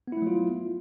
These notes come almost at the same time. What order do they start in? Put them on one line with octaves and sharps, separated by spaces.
B3 E4 A3 F#3 F4